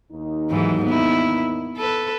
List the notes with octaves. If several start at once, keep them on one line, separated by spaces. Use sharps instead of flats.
D#2 D#4
G#2 E3 F#3
B3 E4
A4 B4